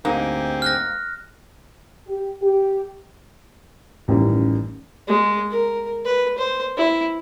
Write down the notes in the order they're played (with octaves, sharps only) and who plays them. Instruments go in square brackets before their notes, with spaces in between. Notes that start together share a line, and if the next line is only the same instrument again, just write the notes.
[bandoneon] D2 G4 G#5 [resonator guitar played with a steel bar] G#2 A#3 D#4 [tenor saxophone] C4
[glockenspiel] F6 F#6 A#6
[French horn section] G4
G4
[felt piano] A1 F#2 D#3 E3 G3
[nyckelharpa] G#3
A#4
B4
C5
E4